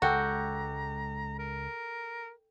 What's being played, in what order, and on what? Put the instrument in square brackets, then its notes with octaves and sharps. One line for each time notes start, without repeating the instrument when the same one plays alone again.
[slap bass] C#2 G#3 [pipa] F#4 [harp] A4 G5 D6 [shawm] A#5
[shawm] A#4